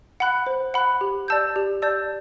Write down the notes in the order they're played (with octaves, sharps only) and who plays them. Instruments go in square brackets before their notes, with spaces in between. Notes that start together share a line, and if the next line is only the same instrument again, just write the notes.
[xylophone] F#5 B5 F#6
C5
F#5 B5 F#6
G4
D5 A5 E6 G6
G4
D5 A5 E6 G6